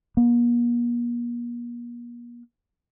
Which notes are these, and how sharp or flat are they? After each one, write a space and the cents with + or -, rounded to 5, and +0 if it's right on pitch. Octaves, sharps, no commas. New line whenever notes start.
A#3 +45